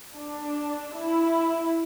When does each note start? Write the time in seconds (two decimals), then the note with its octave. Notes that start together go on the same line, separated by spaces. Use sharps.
0.16 D4
0.95 E4